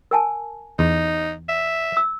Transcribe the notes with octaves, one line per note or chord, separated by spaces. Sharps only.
A#4 G#5 A5
E2 D#4
E5
E6